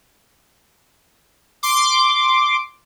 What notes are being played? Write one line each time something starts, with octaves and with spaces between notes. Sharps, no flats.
C6 D6